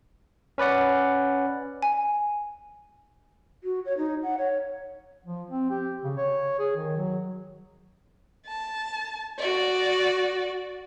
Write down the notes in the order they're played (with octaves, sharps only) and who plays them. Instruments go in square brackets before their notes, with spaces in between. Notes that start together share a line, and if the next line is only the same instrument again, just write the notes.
[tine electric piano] C#4 B4 D5 F#5
[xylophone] G#5
[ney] F#4
C#5
D#4
F#5
C#5
[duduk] F3
C4
G4
C#3
C#5
G#4
D#3
F#3
[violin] A5
F#4 D5